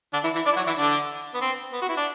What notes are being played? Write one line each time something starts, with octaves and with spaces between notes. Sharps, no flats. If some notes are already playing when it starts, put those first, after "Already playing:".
D3 D4
E3 E4
E3 E4
D4 D5
E4
F#3 F#4
E3 E4
D3 D4
B3
C4
B3
F#4
E4
D4